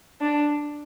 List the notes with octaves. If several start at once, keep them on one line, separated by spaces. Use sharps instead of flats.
D4